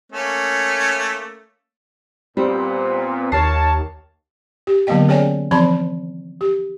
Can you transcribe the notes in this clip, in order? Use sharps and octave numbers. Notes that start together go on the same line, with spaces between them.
A3 A#3 C#4
A#2 G3 B3 C4
D#2 A#4 C#5 A5 C7
G4
D3 F#3 A#3 B3 D#5 G5
C#4 G#4 C#5 D5 G5 G#5
E3 F3 C4 D5 A5 B5
G4